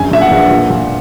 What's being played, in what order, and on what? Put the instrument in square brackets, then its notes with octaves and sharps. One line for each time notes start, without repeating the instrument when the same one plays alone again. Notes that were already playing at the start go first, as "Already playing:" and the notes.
Already playing: [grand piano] A#1 F#2 G#5
A#2 E5
F#5
A#1
A#2
A#2